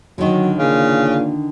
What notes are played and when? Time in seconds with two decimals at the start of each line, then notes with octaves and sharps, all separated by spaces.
0.18 D3 D#3 F#3
0.59 A#2 C#3